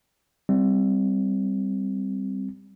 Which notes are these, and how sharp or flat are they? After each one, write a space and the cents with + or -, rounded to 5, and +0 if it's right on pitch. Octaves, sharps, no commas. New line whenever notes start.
G3 +0 C4 +0